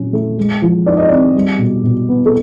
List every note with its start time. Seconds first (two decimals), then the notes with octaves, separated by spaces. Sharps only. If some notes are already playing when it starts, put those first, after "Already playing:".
Already playing: A#2 F#3 C#4
0.13 A3
0.38 G#3
0.62 F3
0.86 D#4 D5
0.97 D#5
1.09 C4 D5
1.35 G3
1.59 B2
1.84 B2
2.09 B3
2.26 A4